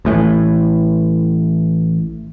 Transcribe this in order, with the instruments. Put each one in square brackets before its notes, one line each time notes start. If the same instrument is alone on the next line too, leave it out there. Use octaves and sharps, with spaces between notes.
[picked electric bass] A1 A2 E3